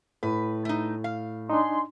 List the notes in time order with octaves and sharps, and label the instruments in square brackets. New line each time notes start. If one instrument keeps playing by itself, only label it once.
[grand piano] A2 [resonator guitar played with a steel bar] B4
[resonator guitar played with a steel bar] A3 D#4
F5
[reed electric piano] D4 D#4 [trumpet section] G#5 C6